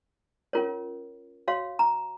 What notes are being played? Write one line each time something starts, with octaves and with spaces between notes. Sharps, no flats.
C#4 F4 A#4 C#5
F#4 C#5 F5
A#5